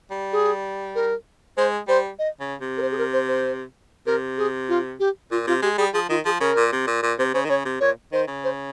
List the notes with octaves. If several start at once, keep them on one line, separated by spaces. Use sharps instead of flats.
G3
G#4
A#4
G#3 C5
G3 C5
D#5
C#3
C3
A#4
C5
G#4
A#4
C5
C5
C3 A#4
G#4
F4
G4
A#2 F4
C3 F4
G#3 G4
G3 G#4
F3 G#4
D#3 F4
F3 G#4
C#3 A#4
A#2
C3
A#2
A#2
C3 C5
C#3 C5
D#3
C#3 C#5
C3
A#2 C#5
D#3 C5
C#3
C5